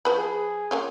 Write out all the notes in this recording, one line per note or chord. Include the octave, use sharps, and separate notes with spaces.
F3 B4 B5
G#4
A#3 C#4 F4